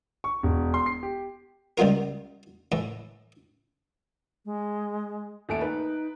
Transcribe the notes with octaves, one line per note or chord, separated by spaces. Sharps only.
C#6
E1
C6
C7
G4
C#2 G3 B3 F4 A#4
A2 E3
G#3
D#1 A3 D7
D#4 B4